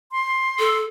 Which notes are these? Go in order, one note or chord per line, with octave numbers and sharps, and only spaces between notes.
C6
A4